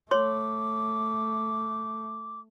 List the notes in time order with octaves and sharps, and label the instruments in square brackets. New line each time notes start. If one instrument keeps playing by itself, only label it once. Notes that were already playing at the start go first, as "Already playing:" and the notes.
[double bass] A3 [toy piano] C#5 C6 [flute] D6